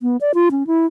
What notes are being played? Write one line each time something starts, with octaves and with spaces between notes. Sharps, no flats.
B3
D5
F4
C#4
E4